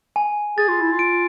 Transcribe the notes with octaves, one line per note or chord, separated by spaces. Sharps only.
G#5
G#4 A6
F4
E4
F4
D7